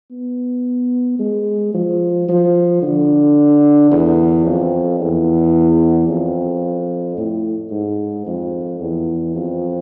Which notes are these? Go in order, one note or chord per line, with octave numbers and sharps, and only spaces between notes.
B3
G#3
F3
F3
D3
E2
F2
E2
F2
A2
G#2
F2
E2
F2